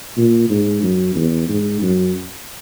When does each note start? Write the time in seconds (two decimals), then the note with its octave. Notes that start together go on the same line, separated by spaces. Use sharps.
0.17 A#2
0.50 G#2
0.83 F#2
1.16 E2
1.49 G#2
1.82 F#2